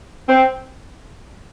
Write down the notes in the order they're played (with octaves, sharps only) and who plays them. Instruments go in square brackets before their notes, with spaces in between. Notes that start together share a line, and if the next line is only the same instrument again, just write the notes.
[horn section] C4